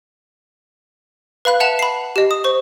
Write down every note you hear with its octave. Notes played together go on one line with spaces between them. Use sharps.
B4 F5 B5 F#6
E5 F#5 A5 E7 F7
B5 C7
G4 D#5
D#6
C5 C#6